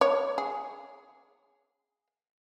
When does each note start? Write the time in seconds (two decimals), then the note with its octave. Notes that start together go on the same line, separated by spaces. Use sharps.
0.01 C#5
0.38 G#4